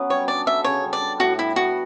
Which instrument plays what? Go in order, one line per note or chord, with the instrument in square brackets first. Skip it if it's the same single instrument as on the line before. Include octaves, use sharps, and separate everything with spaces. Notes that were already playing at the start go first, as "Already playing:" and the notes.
Already playing: [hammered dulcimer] F#3 B3 C#4
[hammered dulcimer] G3 [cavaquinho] C#5
[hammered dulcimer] D4 [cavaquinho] D5
[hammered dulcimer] A4 [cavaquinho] E5
[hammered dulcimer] C#3 [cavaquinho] C#5
[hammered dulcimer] G3
[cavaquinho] D5
[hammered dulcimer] D4
[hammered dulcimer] A2 [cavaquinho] F#4
[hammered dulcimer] G3 [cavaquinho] E4
[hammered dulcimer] B3 [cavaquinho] F#4